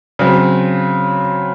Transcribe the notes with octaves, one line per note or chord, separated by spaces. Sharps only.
C#3 F#3 C4